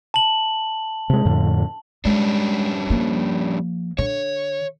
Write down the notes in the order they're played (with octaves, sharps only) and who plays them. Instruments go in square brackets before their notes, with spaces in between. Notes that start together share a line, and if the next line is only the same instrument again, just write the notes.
[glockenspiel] A5 F#7
[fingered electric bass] C3 G#3
F2 A2 D3
[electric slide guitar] G3 C#4 D4 [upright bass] G#3
[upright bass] F3 A#3
[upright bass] D3 [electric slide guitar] C#5